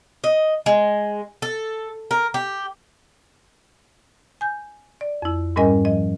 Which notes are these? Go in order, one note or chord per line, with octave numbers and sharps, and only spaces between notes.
D#5
G#3
A4
A#4
G4
G#5 G6
D5
F2 E4
G#2 G3 C#4 A#4 D#5 G#5
F3 D#5